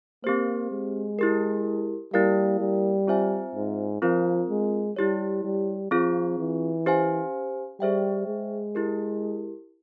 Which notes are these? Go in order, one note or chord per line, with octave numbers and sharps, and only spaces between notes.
A#3 C4 G4 C5
G#3
E4 G4 A#4
G3 A#3 E4 A#4 F5
G3
C4 F4 C5 E5 G#5
G#2
F3 C4 F4 A#4
G#3
G3 E4 G4 C#5
G3
F3 C4 F4 G#4
E3
C#4 G4 C5 F5 G#5
G3 G#4 C5 E5 G5
G#3
E4 G4 A#4